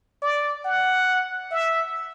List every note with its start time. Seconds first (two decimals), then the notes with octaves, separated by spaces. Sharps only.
0.22 D5
0.65 F#5
1.51 E5